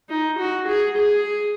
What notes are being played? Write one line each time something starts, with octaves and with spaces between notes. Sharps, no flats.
D#4
F#4
G#4
G#4